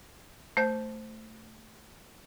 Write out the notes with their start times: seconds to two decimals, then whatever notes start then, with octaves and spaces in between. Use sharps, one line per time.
0.57 A3 C5 G6